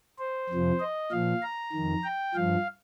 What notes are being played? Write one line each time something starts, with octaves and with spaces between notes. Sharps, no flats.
C5
F2 C3 F3
D#5
A#2 F3 F5
A#5
F2 D#3
G5
G2 F3 F5